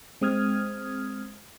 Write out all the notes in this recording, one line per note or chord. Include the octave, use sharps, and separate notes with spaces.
G#3 C4 D#6 F6 G#6